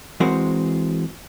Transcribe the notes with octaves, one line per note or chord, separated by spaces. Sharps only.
E3 G#3 C4 F#4 A#4 C5